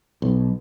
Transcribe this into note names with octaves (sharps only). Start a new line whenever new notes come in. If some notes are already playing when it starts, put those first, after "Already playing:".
B1